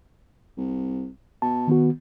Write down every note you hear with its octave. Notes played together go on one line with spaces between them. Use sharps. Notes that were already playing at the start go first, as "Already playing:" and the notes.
C2
B2 A5
D#3 B3 F#4